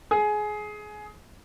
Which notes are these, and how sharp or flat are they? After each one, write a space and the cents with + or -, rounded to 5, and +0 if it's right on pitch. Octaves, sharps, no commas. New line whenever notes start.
G#4 +20